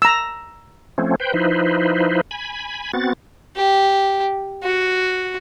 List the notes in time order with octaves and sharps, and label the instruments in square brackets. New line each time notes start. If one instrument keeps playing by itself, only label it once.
[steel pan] A#5 E6
[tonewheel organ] F3 A3 C4 C#4
B4 C5 G5
F3 D#4 E4 B4 C5
G#5 B5
B3 C4 F#4 A6
[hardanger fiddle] G4
F#4